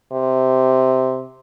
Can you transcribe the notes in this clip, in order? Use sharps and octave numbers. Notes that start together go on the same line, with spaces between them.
C3